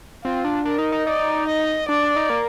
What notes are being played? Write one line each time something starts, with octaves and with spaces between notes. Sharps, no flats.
C4 F4
D4
D4 A#4
D#4
D#4
D#4 D5
D#5
D4 D5
D4
D#4
A#3